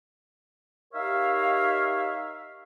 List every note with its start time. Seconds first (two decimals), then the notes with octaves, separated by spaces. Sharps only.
0.94 D#4 G4 A#4 C#5 E5 F5